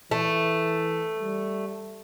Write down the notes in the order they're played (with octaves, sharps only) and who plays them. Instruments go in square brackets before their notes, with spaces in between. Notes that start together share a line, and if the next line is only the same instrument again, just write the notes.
[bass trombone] E3 [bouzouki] A3
[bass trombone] G3